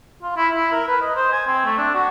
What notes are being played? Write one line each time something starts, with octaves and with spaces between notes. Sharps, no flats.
F4
E4
E4
A#4
B4
D#5
C5
G#5
C4
A3
D4
F#4